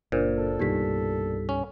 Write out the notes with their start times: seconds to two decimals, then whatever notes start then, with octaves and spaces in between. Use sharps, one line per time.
0.12 F#1 A#2 D4 A#4 C5
0.38 A4
0.59 C2 G2 B2 D#4 G4 B6
1.49 C#4